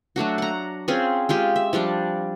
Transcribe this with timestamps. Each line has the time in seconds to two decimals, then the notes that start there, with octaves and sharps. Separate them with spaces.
0.16 F#3 A3 D4 F#4
0.38 F#5 A#5
0.88 C4 C#4 F4 G#4
1.29 G#3 F4 G4
1.56 E5
1.73 F3 G3 D4 D5